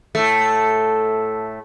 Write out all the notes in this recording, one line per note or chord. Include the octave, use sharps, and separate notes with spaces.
A2 A3